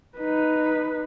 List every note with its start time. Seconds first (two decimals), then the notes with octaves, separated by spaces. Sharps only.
0.18 D#4 B4